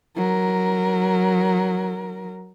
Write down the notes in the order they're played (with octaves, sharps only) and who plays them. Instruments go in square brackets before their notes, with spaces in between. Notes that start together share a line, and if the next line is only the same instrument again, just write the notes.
[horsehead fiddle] F#3 A#4